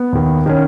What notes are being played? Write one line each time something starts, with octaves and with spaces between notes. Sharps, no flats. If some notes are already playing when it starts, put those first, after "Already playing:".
Already playing: B3
D#2 D#3
D#3 C#4